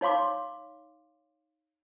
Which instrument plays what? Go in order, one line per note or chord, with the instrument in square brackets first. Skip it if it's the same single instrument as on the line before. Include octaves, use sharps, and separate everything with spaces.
[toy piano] D#4 C#5 F5 C6 D6